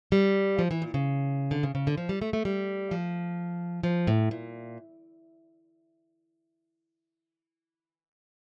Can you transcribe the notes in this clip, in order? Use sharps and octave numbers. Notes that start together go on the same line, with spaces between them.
G3
F3
E3
A#2
C#3
D3
C#3
C#3
D3
F3
G3
A3
A3
G3
F3
F3
A2
A#2